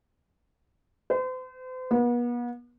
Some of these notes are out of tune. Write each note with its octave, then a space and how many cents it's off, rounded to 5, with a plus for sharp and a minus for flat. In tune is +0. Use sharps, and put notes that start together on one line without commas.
C5 -40
B3 -40